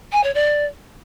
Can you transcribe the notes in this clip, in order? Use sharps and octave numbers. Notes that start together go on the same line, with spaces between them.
G#5
C#5
D5